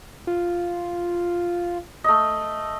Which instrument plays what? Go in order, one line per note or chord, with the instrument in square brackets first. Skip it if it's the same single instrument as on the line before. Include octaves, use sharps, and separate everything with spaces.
[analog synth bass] F4
[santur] A3 D#5